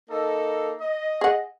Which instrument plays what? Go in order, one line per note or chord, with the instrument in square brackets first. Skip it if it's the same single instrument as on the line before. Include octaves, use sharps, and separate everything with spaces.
[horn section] A#3 D#4 A4
D#5
[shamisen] G#4 F#5